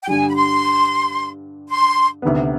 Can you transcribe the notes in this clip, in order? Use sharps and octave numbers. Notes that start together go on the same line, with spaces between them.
G5
G2 D3 G3 G#5
B5
C6
C6
D2 C3 D#3 B3